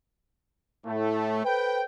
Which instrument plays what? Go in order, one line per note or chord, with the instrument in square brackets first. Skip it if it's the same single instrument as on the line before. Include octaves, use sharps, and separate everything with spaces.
[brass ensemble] A2 A3
A4 B4 C5 G5